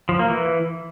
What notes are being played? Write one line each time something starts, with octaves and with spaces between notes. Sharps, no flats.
F3
A#3
E3